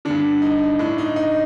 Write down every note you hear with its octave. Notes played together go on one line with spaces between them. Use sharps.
G2 D3 D4
D#4
A2 D4
D#4
D#4